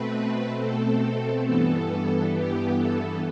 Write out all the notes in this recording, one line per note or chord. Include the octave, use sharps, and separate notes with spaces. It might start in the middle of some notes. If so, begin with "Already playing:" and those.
Already playing: B2 A3 C4 B4
A4
G2 E3 B3 A4
G4
A4